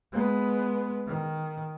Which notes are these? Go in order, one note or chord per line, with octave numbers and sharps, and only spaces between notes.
G#3 B3
D#3